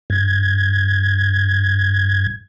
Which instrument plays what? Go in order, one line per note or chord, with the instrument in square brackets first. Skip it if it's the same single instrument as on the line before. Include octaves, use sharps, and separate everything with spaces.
[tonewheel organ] G2 G#6